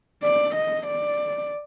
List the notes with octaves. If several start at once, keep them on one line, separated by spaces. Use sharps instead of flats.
D5
D#5
D5